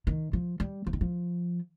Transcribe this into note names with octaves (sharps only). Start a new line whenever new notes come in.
D#3
F3
G3
F3
D#3
F3